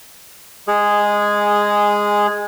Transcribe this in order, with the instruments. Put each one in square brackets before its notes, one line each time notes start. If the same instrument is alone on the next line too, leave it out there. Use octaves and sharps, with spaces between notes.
[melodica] G#3 G#4